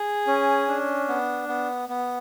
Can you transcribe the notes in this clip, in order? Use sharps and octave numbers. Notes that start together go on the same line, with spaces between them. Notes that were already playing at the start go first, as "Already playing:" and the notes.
Already playing: G#4
C#4
D4
B3
B3
B3